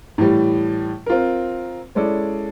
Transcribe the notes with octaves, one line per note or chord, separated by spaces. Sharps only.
A2 E3 G3
C4 F4 A#4
G#3 C#4 E4 A4 D5